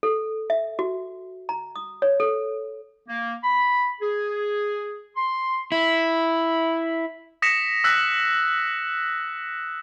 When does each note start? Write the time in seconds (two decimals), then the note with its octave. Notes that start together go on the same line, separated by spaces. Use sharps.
0.03 A4
0.50 E5
0.79 F#4
1.49 A#5
1.76 D#6
2.02 C#5
2.20 A4
3.09 A#3
3.44 B5
4.01 G#4
5.16 C6
5.72 E4
7.42 D#6 A#6 B6 C#7 E7
7.84 E6 F#6 A#6 B6